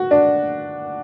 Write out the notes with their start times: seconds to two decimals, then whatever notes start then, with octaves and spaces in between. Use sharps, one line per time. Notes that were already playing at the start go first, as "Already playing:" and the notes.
Already playing: F#4
0.11 D4